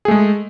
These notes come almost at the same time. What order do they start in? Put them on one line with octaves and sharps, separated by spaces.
G#4 A3 G#3